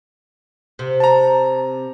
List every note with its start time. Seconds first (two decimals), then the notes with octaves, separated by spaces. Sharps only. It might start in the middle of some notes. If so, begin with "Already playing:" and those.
0.79 C3
1.00 A5 A#5